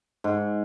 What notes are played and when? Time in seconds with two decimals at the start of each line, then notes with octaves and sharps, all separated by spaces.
0.24 G#2